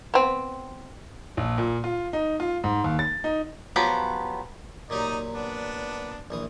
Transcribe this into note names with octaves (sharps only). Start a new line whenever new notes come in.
B3 C4
A#1
A#2
F4
D#4
F4
G#2
D#2
A6
D#4
F3 F#3 B3 G4
A#2 F#3 D#4 G4 D5 D#5
B3 D4
A#1 E3 D#6